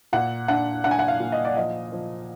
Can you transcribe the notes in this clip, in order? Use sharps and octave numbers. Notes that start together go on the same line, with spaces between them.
A#2 F#5
D4 F#5
D4 F#5
G#5
F#5
F5
A#2
D#5
D5
F3 D#5
F3